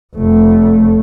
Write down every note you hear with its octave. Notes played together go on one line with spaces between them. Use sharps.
F1 A3